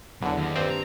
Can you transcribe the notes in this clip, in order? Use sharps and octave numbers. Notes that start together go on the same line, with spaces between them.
E2 D3 F#3
D#2
G2 C4
A#5